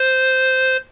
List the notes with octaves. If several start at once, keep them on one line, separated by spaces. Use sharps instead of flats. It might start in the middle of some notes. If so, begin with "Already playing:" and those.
Already playing: C5